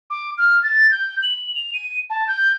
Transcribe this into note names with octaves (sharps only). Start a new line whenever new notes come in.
D6
F6
A6
G6
F#7
F7
D#7
A5
G6